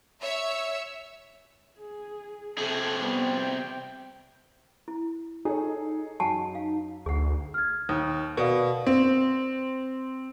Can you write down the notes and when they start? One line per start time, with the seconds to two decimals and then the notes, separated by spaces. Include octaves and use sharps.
0.21 C#5 E5 E6
1.79 G#4
2.58 C3 G#4 A4
2.99 G3 B3
3.40 G5
4.88 E4
5.45 D#4 G#4 A4 C#5
6.20 F#2 F#5 G#5 A5
6.55 F5
7.06 D2 G#4 F#5
7.54 F6 G#6
7.89 D#2 D#6
8.37 B2 A#4 D5 F5
8.87 C4